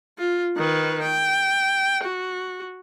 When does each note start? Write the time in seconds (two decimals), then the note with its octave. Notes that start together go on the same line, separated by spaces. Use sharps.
0.18 F4
0.56 D#3 B4
1.02 G5
2.04 F#4